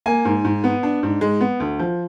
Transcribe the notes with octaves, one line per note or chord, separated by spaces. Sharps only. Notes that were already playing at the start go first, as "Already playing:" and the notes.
A#3 G#5
G#2
G#2
B3
D4
G#2
G#3
B3
D2
F3